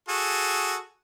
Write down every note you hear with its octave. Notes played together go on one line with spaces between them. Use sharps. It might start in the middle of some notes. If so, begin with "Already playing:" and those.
F#4 G#4 A4